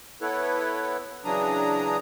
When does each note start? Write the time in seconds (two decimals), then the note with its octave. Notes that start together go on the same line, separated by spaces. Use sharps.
0.21 B3 E4 A4 B4 C#5
1.25 C#3 E3 F#3 D4 A#5 D#6